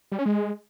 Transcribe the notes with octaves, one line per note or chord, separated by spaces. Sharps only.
G3
C#4
G#3